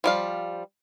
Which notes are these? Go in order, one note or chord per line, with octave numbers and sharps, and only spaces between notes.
F3 G3 F5